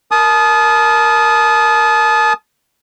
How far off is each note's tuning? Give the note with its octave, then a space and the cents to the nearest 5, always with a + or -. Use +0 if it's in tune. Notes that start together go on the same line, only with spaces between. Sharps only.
A#4 +0 A5 -35 D#6 +0